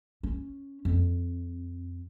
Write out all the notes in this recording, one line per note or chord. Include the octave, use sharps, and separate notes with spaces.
C#4
F2